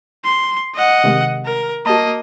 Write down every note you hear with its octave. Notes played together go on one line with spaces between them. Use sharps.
C6
D#5 F#5
C3 D#3 G#3
A#4
A#3 F#4 D#5 A5